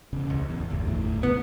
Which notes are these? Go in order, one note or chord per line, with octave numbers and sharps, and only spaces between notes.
E1 C#3
C#2
D1 E2
G1 D2
E2 A2 E3
C2 B3